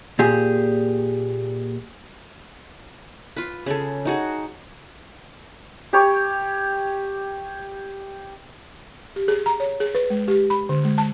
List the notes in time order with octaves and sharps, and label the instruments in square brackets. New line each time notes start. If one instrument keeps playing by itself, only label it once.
[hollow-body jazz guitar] A#2 G4 G#4
[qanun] F4 B4
C#3 G#4 A4
D#4 F#4 G#4
[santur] G4 C#5
[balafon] G4
G#4
A#5
C#5
G#4
B4
G#3
G4
B5
D3
G#3
A5